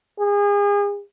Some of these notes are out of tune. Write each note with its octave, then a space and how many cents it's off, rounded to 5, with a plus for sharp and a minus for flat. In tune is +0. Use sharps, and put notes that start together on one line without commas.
G#4 -35